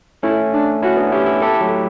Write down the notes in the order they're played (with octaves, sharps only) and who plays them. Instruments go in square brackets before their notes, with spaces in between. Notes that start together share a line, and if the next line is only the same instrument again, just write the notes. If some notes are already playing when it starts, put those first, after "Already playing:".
[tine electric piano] A3 C#4 [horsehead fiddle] E4
[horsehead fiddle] D4
[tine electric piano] C#4 E4 [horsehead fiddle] F#4
[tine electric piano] B3 D4
[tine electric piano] C#4 E4 [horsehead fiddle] G4
[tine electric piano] E4 G4
[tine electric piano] E4 G4 [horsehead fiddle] A4
[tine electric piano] F#3 A3